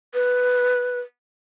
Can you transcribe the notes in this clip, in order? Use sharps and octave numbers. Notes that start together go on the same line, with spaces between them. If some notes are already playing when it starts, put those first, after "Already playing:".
B4